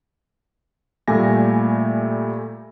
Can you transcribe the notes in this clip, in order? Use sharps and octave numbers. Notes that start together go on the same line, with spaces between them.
A#2 G3 A3 G#5 A#6